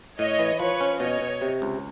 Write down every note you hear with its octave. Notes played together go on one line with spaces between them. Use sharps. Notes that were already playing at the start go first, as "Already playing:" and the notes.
A2 C#5 D#5
E3
F3 B4 C#5
C#4
B2 C#5 D#5
B2
C3
C#2